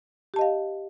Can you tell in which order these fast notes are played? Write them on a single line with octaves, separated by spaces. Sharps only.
G4 A5 D#5 F5